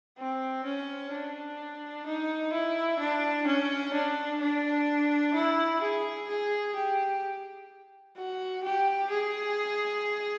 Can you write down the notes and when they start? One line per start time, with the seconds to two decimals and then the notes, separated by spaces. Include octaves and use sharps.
0.18 C4
0.65 C#4
1.12 D4
2.06 D#4
2.52 E4
2.99 D4
3.47 C#4
3.93 D4
4.40 D4
5.34 E4
5.81 G#4
6.29 G#4
6.75 G4
8.16 F#4
8.63 G4
9.10 G#4